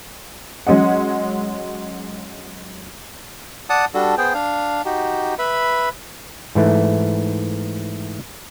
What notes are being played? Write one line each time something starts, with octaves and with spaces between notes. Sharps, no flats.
F#3 G#3 C#4 D#5 F#5
D5 F#5 A5 D#6
G3 D4 F#4 A4
B3 G#4 C5 G5
D4 F5
D#4 F#4 G4
B4 E5 B5
G#2 E3 A3